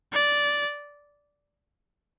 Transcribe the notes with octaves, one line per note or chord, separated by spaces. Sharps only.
D5